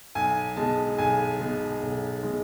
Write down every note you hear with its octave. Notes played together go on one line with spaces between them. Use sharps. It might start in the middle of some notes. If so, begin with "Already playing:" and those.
B1 G#5
B2 G#3 A5
B1 G#5
B2 G#3
B1
B2 G#3